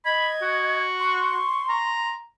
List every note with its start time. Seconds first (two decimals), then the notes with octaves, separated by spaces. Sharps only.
0.05 D#5 B5 G#6
0.42 F#4
1.00 C6 C#6
1.69 A#5